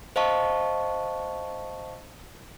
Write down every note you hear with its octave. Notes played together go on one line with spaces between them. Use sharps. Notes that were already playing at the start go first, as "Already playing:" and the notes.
C5 D#5 F5 A5 C#6